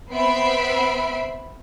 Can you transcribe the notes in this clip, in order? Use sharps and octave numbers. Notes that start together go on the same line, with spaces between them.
B3 C4 E5 B5 C7 D7